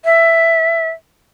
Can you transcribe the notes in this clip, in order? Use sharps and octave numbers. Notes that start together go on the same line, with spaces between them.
E5